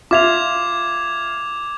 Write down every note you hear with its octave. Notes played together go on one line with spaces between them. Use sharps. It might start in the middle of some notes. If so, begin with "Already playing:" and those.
F4 E5 D6 G#6 F7